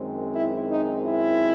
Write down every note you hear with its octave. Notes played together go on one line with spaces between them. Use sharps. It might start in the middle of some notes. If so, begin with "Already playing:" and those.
Already playing: F#2 D#3 G#3 C4
E4
D#4
E4